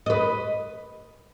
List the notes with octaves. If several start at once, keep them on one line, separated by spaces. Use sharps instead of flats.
B4 D#5